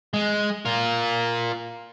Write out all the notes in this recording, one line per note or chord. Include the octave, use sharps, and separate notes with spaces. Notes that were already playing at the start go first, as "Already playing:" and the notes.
G#3
F4 A#4